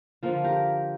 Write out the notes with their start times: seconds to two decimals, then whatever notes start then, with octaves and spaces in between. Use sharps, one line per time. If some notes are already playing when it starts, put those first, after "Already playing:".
0.23 D3 F3 A#3 F4 A4
0.44 G4 A#4